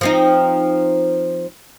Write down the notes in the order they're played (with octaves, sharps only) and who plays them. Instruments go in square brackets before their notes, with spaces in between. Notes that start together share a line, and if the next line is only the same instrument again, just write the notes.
[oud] F3 C4 D#4